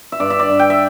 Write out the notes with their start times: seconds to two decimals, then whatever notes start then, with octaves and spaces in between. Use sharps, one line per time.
0.12 E5
0.20 G2 D5
0.30 E5
0.39 D5
0.49 G2
0.59 G5
0.70 E5